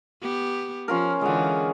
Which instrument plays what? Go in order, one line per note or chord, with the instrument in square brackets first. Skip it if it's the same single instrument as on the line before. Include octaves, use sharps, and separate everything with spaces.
[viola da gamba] B3 G4
[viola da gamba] F3 [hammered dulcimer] C#4 F4 A#4
[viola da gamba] D3 E3 [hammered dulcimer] G#3 F#5